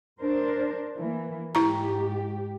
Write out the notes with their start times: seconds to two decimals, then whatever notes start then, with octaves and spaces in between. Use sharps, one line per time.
0.19 D4 A#4 C5
0.98 E3 A#3
1.55 G#2 E4 G4 A#5